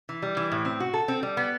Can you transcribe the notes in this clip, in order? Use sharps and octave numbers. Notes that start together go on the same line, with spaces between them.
E3
G3
E3
A2
C4
F#4
A4
C4
G3
B3